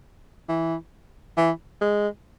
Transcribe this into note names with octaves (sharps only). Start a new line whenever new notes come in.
E3
E3
G#3